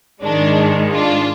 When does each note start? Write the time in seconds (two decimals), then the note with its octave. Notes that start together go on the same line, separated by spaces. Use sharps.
0.22 G#2 D#3 G#3 D4
0.91 D4 F4